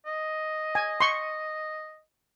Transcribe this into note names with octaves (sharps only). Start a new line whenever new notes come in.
D#5
G#5
C6 C#6